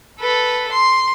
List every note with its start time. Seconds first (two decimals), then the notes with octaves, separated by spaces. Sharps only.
0.20 A4 B4
0.72 C6